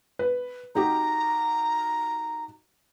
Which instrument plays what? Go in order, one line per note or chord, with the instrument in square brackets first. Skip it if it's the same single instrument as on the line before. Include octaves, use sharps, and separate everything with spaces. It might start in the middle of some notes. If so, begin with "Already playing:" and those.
[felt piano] B4
[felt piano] D#4 F#4 G4 [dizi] A#5